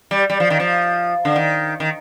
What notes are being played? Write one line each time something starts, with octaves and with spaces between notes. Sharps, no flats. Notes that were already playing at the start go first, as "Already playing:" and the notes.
G3
G3
F3
D#3
F3
D3
D#3
D#3